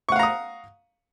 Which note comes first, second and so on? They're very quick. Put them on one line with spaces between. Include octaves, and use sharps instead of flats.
C#6 F#5 F5 A#5 D#6